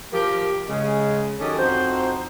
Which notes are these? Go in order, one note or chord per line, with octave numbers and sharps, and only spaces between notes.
F3 G4 A#4
C#3 G#3
D#3 F#3 C#4 G4 A4 D#5
F2 D#4 F#4 C5